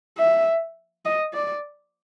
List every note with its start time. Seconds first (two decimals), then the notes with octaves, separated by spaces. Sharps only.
0.18 E5
1.05 D#5
1.33 D5